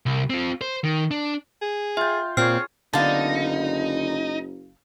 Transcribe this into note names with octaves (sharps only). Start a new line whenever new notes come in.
C2
C4 F4
C5
D#3
D4
G#4
F4 E5 G5
A#2 C4 G#4 C#5 F6 C7
F#1 D3 B3 D#4 F5 A5